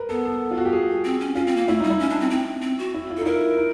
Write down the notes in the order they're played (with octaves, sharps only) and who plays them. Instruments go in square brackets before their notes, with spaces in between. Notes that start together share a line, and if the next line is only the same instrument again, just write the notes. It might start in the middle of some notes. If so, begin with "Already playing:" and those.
Already playing: [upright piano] A#4 B4
[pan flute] B3 [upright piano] A4
[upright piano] A4
F4
F#4
G4
G#4
[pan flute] C4
C#4
[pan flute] C#4 [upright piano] F4
[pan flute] C4
A#3
[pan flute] A3 [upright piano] E4
[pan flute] G3 [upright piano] D#4
[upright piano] E4
[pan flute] C#4
D4
C4
C4
C4
F#4
[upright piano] E4
F4
[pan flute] A4
[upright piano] D#4
[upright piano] E4 [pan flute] A#4
[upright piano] D#4